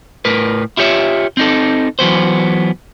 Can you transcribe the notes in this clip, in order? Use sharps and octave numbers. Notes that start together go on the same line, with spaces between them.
A2 A#4 B4
E4 F4 G4 C#5 E5
C4 D#4 A4
E3 F#3 B3 C5